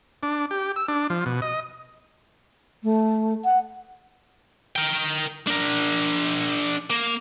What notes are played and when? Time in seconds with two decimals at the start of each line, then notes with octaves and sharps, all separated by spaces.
0.23 D4
0.51 G4
0.76 E6
0.88 D4
1.10 F3
1.26 B2
1.42 D#5
2.83 A3
3.45 F#5
4.76 A#4 G5
5.47 D4 A#4
6.90 A#3